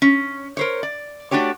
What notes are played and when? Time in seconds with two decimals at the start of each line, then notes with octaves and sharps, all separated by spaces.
0.02 C#4
0.57 A#4 C5 C#5
0.83 D5
1.31 A3 D4 F#4 G4 C#5